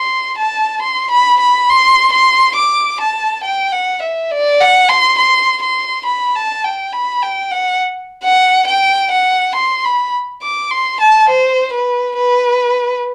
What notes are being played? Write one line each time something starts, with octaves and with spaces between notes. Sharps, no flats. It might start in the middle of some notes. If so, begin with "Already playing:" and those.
Already playing: C6
A5
C6
B5
B5
C6
C6
D6
A5
G5
F#5
E5
D5
F#5
C6
C6
C6
B5
A5
G5
B5
G5
F#5
F#5
G5
F#5
C6
B5
D6
C6
A5
C5
B4
B4